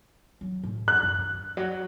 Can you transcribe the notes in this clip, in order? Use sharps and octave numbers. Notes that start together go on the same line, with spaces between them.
F#3
A2
F#2 F#6
F#2
D3
D3
F#3